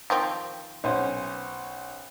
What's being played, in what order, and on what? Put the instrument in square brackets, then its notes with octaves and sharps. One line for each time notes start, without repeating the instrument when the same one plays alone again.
[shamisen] D#3 F3 C4
[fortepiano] B1 C#4 C5